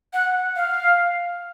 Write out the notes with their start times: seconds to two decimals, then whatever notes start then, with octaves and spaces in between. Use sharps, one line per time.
0.13 F#5
0.56 F5